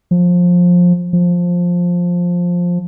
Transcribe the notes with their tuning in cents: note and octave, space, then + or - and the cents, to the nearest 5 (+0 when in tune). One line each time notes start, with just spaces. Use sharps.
F3 +20
F3 +10